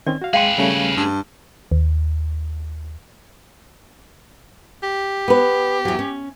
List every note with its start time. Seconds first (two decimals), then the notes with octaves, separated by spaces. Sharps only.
0.07 D#3 C4 C#4 D5
0.22 F#4 F5
0.33 G#3 G#4 B4 F5 G5 C6
0.58 C#3 G3 A3 C#4
0.97 G2
1.71 D#2
4.83 G4
5.28 B3 B4
5.85 E2 F#3
5.99 C#4